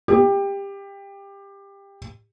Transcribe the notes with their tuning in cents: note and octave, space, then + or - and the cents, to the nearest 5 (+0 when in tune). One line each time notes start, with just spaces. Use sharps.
G4 +20